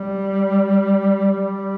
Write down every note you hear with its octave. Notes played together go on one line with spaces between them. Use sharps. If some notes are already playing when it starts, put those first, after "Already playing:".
Already playing: G3
G3